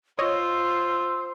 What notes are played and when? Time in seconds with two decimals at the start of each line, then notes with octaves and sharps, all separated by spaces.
0.19 F4 C5 C#5 D#5 E6